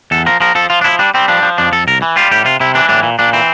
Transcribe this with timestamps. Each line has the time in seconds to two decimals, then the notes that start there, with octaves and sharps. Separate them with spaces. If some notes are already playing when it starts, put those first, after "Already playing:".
0.11 E2 A4
0.26 F3 A#4
0.40 F3 A#4
0.55 F3 A4
0.70 F3 F4
0.81 D4
0.84 F3 E4
0.99 G3 D4
1.14 G3 C4
1.28 F3 D4
1.43 F3
1.58 F2 D4
1.72 F2 A4
1.88 C2 A#4
2.02 E3
2.16 G3 F4
2.31 A2 G4
2.45 C3 F4
2.60 C3 E4
2.75 E3 D4
2.89 A2 D4
3.03 A#2
3.19 A#2 D4
3.33 E3 C4